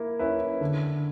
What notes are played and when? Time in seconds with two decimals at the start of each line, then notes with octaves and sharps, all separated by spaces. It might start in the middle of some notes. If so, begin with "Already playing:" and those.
Already playing: A#3 E4
0.19 C#4 E4 B4
0.61 D3